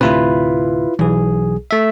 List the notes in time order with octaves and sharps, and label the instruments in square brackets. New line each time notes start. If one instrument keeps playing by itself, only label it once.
[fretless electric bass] D2 A2 C3 [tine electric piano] E4 F4 B4
[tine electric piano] B1 G#4 [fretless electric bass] E3
[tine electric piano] A3 E5